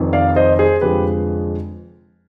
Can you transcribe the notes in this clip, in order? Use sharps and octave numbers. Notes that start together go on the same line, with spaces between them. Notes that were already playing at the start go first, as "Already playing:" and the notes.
Already playing: F1 F2 D#3
D5 F5
C5 D#5
G#4 C5
F1 F2 D3 F3 G#3 G4 B4